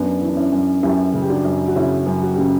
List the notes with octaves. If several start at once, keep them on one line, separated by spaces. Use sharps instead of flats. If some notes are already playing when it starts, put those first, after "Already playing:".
Already playing: F#2 B3 D4
E3
D4
C#4 E4
F#2
F#2 E4 G4
C#3
G4
D4 F#4
F#2
F#4
C#3 C#4 E4
F#2
F#4
C#3 G4